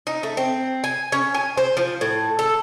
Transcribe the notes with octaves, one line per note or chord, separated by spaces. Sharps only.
D#4
A3
C4
G#5
C#4
G#5
C5
F3
A2
A4